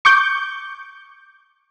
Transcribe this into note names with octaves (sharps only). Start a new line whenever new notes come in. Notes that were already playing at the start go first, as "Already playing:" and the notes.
C#6 D6 G6